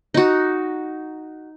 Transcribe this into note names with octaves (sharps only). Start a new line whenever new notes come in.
D#4 F#4